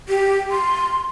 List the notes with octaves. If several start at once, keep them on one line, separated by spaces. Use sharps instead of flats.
G4
C6